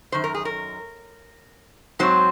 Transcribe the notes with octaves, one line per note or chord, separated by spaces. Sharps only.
F#2 D#3 C5
A#4
G#4
A#4
G#2 F#3 C4 C5